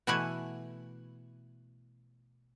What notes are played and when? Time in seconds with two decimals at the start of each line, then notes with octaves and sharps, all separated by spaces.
0.07 B2 E3 A3 E4 F#5 G#5